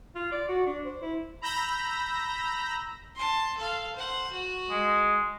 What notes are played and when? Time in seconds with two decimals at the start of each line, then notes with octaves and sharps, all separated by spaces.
0.15 F4
0.32 D5
0.48 F#4
0.66 D4
0.85 C5
1.02 E4
1.41 A#5 B5 E6 G6 A#6
3.16 A5 C6
3.57 A4 F5
3.96 C5 F#5
4.31 F#4
4.70 G#3